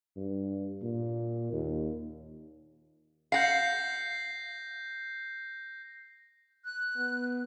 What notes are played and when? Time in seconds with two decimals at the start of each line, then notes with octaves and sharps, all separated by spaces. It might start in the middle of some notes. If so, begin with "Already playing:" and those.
0.16 G2
0.82 A#2
1.52 D#2
3.32 F5 F#5 G6 A#6 C7
6.64 F#6
6.97 B3